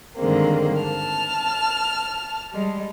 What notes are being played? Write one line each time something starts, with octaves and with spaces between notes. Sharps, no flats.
G2 D3 D#3 G#3 A#3 C4
A5 F6
G3 G#3